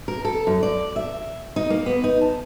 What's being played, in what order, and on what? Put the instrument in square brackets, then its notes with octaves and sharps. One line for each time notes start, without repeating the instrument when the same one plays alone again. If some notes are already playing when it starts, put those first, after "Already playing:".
[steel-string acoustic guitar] A#4
A4
F#2
D5
E5
D#4
A#3
B3
D#4
A5